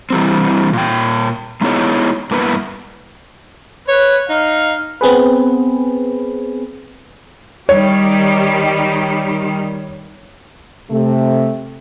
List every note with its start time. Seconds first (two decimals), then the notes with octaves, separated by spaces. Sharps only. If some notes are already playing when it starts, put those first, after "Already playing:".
0.10 E3 G3 C4
0.73 A#2 G5
1.61 G#3 B3 D#4 E4 G#4 C#5
2.31 G2 A#3 B3 E4 G4 B4
3.88 B4 C#5
4.29 D#4 F5
5.01 B3 C4 G#4 B4
7.69 D#3 G3 C#5
10.91 C3 A3